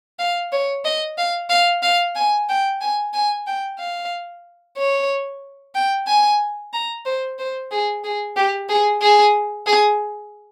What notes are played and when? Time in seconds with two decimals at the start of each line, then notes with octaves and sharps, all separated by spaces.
0.19 F5
0.53 C#5
0.85 D#5
1.18 F5
1.50 F5
1.83 F5
2.16 G#5
2.49 G5
2.81 G#5
3.13 G#5
3.47 G5
3.79 F5
4.78 C#5
5.75 G5
6.07 G#5
6.73 A#5
7.06 C5
7.39 C5
7.71 G#4
8.04 G#4
8.37 G4
8.69 G#4
9.02 G#4
9.67 G#4